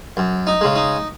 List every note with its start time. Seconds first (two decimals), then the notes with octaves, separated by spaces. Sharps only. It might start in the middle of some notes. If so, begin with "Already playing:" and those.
0.17 F#2
0.47 D#4
0.61 C#3 G#3
0.76 D#4